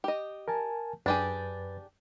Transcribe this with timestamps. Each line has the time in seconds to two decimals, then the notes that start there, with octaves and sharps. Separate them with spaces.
0.04 G4 D#5
0.48 A#4 G#5 A5
1.06 F#2 D4 G4 G#4 B4 A6